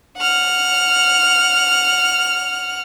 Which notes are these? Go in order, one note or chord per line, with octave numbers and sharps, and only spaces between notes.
F#5 F6